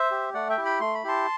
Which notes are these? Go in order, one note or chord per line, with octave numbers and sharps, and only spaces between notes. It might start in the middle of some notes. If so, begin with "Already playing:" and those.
Already playing: C5 E5
G4
A3 D5 F#5
E5 G5
E4 G4
G5 B5
A3 C6
B5
E4 G4 A5 C6